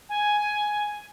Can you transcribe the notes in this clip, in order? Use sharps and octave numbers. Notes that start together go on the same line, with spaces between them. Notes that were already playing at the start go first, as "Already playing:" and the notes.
G#5